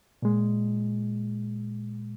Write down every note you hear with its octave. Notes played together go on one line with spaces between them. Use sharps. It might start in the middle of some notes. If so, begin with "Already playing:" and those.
A#2 G#3